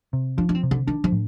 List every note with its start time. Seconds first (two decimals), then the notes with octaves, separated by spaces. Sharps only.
0.13 C3
0.38 F3 D4
0.49 D4
0.55 C4
0.63 C3
0.71 D3
0.87 D#3 D4
1.04 F3
1.12 A2